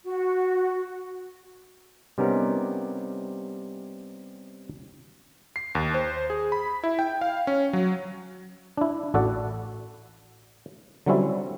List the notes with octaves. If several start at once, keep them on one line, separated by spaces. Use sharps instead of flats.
F#4
C3 G3 B3 C#4 D#4 A#4
C7
D#2
C5
G#4
B5
E4
G5
F5
C#4
F#3
D4 E4
A1 F#4 A4 D5 F#5
D3 F#3 G3 C4 C#4 E4